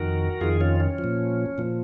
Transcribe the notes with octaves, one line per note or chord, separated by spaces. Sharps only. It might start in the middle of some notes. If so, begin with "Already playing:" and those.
Already playing: F2 D#3 F#4 A#4
F2 D#3 F4 G#4
C#4 F4
C#4
F3
A#2
A#2 F3